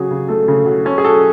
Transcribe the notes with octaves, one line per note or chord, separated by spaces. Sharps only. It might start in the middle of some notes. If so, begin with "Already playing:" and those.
Already playing: C#3 F#3 G#4
C#3
A3 A4
C#3
F#3
C#4 A4
G#4
F#3 A4